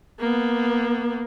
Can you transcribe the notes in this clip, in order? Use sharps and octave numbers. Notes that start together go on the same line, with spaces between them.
A#3 B3